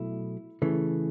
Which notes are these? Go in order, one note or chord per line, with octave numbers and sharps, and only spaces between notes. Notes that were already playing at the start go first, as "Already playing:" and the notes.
Already playing: B2 F#3 A3 E4
C#3 E3 A3